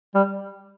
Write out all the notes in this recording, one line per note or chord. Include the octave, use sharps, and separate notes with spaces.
G3